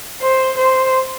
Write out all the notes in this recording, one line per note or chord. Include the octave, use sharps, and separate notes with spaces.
C5
C5